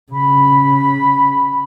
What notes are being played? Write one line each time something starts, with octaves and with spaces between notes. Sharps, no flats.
C#3 B5